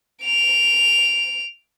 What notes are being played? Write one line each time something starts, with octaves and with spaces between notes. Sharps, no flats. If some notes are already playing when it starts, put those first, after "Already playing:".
D7 F7